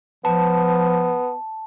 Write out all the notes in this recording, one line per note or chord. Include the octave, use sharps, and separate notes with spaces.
F3 B3 A5